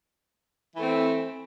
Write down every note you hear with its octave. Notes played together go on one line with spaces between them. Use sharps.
E3 A3 C4